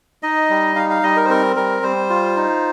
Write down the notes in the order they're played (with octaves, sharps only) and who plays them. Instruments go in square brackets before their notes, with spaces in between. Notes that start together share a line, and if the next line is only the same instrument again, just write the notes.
[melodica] D#4 D#5
G3
D#4 F5
F5
G3 D#5
A#4
C5
C4 A#4
G3 A#4
G3 C5
F4
D#4